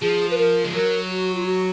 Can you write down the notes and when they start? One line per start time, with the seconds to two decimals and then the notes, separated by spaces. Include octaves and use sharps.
0.01 F3 G#4
0.31 B4
0.37 A#4
0.64 G#3
0.74 F#3 A#4
1.09 F#4
1.35 F4
1.46 F#4